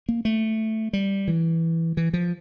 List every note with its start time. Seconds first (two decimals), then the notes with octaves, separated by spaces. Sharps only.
0.09 A#3
0.25 A3
0.93 G3
1.28 E3
1.97 E3
2.13 F3